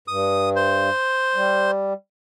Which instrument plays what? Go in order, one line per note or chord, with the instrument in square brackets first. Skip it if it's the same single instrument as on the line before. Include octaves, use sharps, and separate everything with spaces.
[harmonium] G2 [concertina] D#6
[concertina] C5
[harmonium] G3